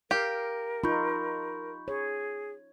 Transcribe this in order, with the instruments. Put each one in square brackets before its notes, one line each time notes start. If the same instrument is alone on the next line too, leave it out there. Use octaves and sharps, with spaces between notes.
[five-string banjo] G4 [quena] A#4 [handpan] F5
[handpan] D#4 F4 [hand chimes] B5 C#6 G6
[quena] G#4 [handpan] C#5